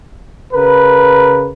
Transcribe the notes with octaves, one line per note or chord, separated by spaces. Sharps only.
C#3 A#4 B4